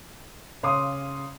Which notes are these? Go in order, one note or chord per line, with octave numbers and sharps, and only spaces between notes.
C#3 C#5 F5 C6 D6 D#6